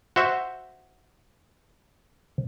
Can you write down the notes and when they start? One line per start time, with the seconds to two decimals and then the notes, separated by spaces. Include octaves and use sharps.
0.16 F#4 C5 E5